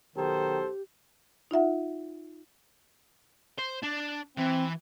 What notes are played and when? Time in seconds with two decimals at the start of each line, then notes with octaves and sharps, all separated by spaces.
0.16 B1 D#3 G4 A4 C5
1.51 D#4 F4 E5 F#5
3.58 C5
3.83 D4
4.37 E3 C4